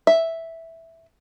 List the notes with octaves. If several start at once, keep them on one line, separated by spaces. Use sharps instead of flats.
E5